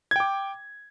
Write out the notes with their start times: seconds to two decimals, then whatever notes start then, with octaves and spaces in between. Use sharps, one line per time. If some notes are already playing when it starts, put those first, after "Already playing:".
0.11 G#6
0.16 G5
0.20 D6